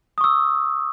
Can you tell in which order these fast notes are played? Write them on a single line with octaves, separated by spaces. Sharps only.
D#6 C#6 E6